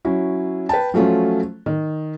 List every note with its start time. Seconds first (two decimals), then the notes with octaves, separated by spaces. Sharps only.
0.05 F#3 C#4 E4
0.69 B4 G5 A5
0.94 F3 F#3 A3 C#4 F4
1.66 D#3